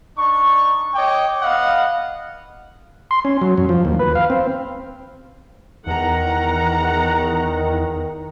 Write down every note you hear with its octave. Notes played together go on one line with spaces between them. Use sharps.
D4 D#4 C#6
C#5 D#5 G5 D6
B3 D#5 F5 F#5
C6
C#4
F#3
F#2
F3
D#2
B4
F5
C4
E2 D#3 A#4 F#5 A#5